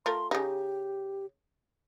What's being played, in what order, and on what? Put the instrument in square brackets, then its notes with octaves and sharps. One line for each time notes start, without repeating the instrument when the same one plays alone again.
[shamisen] A3 F4 A#4 [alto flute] C6
[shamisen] C#3 D#4 [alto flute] G4